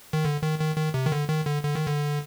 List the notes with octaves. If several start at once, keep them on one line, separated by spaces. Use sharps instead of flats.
D#3
D3
D#3
D#3
D#3
C3
D#3
D3
D#3
D3
D3
D#3
D3